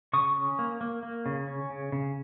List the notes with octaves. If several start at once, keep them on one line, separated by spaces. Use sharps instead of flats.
C#3 C#6 D#6
C#4
A#3
A#3
A#3
C#3
C#4
C#3
C#3